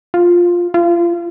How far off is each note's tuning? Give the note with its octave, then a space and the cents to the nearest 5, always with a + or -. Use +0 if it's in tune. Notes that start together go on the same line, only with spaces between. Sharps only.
F4 +5
F4 -30